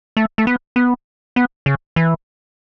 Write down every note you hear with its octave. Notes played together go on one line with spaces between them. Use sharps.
A3
A3
B3
B3
B3
C#3
E3